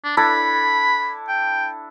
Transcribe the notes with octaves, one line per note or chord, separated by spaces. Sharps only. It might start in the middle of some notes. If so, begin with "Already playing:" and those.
D4
D4 E4 A4 B5
G5